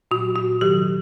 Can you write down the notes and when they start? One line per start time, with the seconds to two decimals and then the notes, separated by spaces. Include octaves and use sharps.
0.11 A#2 F#4
0.14 F#3
0.36 F#4
0.61 C3 D#3 F#3 G4